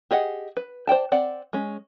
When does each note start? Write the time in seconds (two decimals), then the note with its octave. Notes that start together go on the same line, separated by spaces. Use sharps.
0.11 G4 G#4 D#5 F#5
0.57 B4
0.87 C5 D5 G5 A5
1.12 C4 D5 F#5
1.53 G#3 C#4